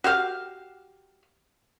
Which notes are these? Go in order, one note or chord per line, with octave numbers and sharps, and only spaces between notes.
F#4 G4 F5 G5